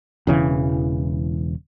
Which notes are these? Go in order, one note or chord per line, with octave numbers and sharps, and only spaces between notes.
E1 C#3 E3